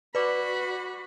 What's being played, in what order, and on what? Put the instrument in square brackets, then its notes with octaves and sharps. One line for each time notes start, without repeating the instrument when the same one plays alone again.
[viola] F#4 B5 [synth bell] B4 D5 D6